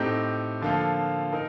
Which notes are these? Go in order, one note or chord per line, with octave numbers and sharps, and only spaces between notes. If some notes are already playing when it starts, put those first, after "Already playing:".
Already playing: A2 A3 C4 D#4 G4
D3 F3 A#3 F4 A4
D#4 A#4